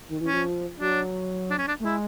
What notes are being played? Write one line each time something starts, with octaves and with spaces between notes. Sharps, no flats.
D#3
E3
C#4
F3
F#3 D4
D4
C#4
D4
A3
G#3 E4